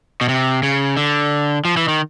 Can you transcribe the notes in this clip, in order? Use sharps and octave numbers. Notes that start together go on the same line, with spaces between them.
B2
C3
C#3
D3
F3
E3
D#3